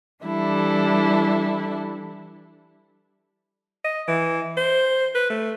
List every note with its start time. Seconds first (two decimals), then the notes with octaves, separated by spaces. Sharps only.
0.24 E3 G3 D4 E4 A4
3.85 D#5
4.08 E3
4.57 C5
5.15 B4
5.30 A3